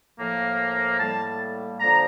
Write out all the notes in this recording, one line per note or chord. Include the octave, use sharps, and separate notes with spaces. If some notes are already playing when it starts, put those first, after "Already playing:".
A2 F3 A#3
A2 G3 A#3 A5
D3 F3 A#3 A#5